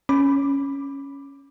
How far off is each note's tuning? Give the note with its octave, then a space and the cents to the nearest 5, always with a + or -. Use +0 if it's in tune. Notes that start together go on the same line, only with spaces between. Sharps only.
C#4 +0 B5 +0 D6 +0